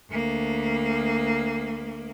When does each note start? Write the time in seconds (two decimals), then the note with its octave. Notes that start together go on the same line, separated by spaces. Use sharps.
0.11 D2 A#3